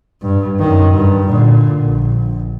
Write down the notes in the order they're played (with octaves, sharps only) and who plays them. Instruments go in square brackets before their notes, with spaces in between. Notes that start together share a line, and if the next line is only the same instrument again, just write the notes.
[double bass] G2
F#2 D#3
G2
A#2 D3
A#1